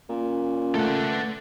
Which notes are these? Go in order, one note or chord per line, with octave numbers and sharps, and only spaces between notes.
A#2 C#4
A3 A4 F#5
B4